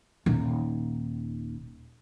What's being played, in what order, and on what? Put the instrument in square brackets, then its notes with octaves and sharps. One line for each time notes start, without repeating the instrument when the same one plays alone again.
[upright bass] D#1 D#4